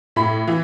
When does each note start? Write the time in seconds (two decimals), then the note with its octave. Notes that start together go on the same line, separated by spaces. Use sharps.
0.16 A2 B5
0.47 E3